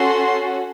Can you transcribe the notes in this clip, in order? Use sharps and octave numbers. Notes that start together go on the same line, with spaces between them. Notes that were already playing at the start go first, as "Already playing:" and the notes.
Already playing: C#4 F#4 A4 C6